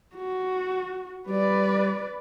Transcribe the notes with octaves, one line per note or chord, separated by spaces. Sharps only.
F#4
G3 B4 D5